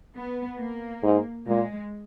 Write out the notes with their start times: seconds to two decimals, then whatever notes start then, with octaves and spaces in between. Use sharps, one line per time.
0.17 B3
0.60 A#3
1.03 G#2
1.47 A#2 G#3